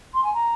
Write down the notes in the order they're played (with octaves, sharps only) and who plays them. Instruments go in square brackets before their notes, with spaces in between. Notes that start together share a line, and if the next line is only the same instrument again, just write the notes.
[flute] C6
G#5
A#5